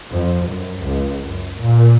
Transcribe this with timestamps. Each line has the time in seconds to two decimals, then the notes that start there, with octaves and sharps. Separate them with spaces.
0.11 F2
0.49 F#2
0.83 C#2
1.27 F#2
1.58 A#2